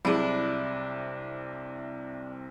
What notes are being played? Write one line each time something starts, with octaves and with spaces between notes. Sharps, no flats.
C2 C3 F#3 D4 E4 G#4